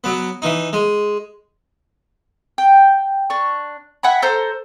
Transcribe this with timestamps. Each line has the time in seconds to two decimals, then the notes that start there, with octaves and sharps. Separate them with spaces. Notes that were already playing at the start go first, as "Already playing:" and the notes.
0.04 F#3 B3
0.42 E3 D#4
0.73 G#3
2.58 G5
3.30 D4 C#6
4.03 E5 F#5 G#5 B5
4.22 A4 C5 A#5